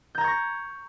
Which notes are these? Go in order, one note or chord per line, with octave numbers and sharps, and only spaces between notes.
A#5 C#6 G6 G#6 A#6